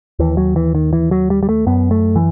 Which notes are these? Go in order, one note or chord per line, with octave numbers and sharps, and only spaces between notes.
D#2 E3
F#3
E3
D#3
E3
F#3
G3
G3
A3
F#2 B3
A3
E3